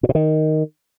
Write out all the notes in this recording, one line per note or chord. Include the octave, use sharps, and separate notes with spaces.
A#2
B2
D#3